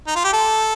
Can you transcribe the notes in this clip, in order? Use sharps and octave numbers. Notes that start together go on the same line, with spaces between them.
D#4
F4
G4
A4